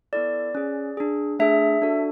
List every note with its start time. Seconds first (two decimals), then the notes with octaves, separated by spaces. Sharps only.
0.13 B3 E4 A4 D5
0.55 C#4 G#4
0.97 D4 G#4
1.39 A3 D4 G#4 E5
1.82 D4 F#4 A4